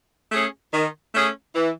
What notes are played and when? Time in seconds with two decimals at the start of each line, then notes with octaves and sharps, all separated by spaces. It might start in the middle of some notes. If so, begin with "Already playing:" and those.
0.32 A3 C#4 G#4
0.72 D#3
1.14 A3 C#4 G#4
1.55 E3